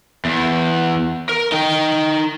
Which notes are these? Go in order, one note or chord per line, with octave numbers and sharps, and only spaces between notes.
E2
A#4
D#4 G5